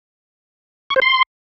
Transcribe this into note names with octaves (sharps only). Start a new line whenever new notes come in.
C#6
C5
C6